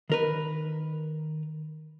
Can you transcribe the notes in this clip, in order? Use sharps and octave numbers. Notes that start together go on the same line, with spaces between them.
D#3 A#4 B4